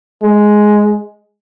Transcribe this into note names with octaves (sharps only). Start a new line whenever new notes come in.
G#3